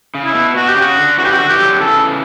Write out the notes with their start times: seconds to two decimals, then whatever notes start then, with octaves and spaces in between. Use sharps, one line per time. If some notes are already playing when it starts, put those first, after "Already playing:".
0.15 C#3
0.25 E4
0.35 B2
0.56 B2 F#4
0.68 G4
0.76 C#3 F#4
0.97 D3
1.17 C#3 E3 F#4
1.25 G4
1.33 F#4
1.39 D3
1.49 E3 G4
1.59 D3 F#3
1.80 C#3 E3 A4